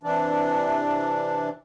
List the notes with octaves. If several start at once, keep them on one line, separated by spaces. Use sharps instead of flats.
C3 E3 D4